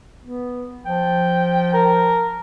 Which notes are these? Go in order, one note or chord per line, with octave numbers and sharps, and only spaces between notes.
B3
F3 G5
A#4